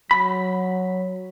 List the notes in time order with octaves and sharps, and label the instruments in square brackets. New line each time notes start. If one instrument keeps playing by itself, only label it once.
[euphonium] F#3 [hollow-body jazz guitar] B5